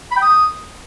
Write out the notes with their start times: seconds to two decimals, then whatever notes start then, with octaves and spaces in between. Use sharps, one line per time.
0.11 B5
0.17 G5
0.22 D#6